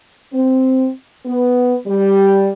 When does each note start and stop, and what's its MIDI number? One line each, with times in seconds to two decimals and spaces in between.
0.32 0.89 60
1.26 1.75 59
1.87 2.47 55